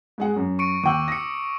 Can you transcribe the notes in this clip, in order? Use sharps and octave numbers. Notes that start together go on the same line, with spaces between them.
G#2 G#3 F#5
F#2
C#6 C#7 D7
D#2 G5 C#6 D6 E6
D#6 A#6 C#7